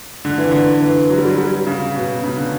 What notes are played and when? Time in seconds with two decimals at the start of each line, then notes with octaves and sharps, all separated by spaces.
0.25 D3
0.38 E3
0.51 D3
0.81 E3
1.09 F#3
1.18 G3
1.26 F#3
1.38 G3
1.67 C#3
1.96 B2
2.24 C#3
2.36 D3